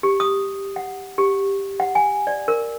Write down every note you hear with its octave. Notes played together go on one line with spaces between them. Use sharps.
G4
D#6
F#5
G4
F#5
G#5
D5
A#4